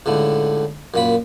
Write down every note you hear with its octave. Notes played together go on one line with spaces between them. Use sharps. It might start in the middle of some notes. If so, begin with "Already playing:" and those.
C#2 A2 D3
F#2 A#2 B5